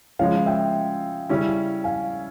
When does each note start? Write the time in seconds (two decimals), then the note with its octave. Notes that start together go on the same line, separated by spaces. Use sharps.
0.19 C#3 F3 G#3 C#5 F5
0.46 E5 G5
1.29 C#3 G3 C#4 E4
1.84 F5 G#5